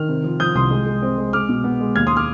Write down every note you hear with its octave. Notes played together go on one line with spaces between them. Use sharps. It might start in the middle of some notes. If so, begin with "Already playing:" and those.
Already playing: D#3 F6
C3
F3
F3 D#6 G6
C2 C6 D#6
G#3
G#3
C4
G#3
G#3 D6 F6
B2
B3
G#3
D#2 F6 G#6
C6 D#6
D6 F6